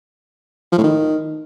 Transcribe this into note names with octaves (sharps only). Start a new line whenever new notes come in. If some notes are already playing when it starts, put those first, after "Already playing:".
F3
A2
D#3